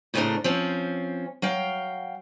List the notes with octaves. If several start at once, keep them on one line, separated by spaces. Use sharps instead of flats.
A2 C#3 A3 C4 D4 A#4
F3 C4 C#4
F#3 F5 G5